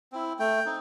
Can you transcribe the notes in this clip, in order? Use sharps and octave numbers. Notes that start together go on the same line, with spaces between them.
C4 E4
A3 G5
C4 D#4